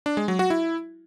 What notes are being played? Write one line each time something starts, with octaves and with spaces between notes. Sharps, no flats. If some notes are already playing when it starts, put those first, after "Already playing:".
D4
G#3
F#3
F#4
E4